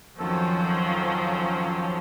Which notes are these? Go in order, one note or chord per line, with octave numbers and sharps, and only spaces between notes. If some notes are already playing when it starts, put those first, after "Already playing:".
F2 D#3 F3 F#3 C#4 A4